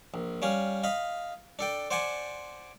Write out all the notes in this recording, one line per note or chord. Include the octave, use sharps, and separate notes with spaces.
A#1
G3 C#4 F5
D#5 F5 B5
D4 A4 G5
C5 D5 F#5 G#5 A5